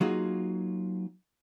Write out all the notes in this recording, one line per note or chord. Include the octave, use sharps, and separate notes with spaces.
F#3 A#3 D#4 F4 F#4 G#4